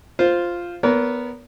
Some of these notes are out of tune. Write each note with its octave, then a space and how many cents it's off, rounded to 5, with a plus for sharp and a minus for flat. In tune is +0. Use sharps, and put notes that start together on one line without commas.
F4 +0 C5 +0
B3 +0 A#4 +0 C#5 +45